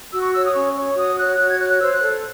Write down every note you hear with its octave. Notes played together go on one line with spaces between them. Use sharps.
F#4 E6
C#6
C#5 E6
D#6
C#4 C#6
C#5
F#4 D#6
C#5 F#6
F#4 F#6
G#6
C#5 F#6
F#6
C5 E6
F#6
A4